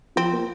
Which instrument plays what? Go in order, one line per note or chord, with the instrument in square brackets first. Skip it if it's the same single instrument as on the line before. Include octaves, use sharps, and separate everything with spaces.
[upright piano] F3 [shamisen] C4
[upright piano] A#3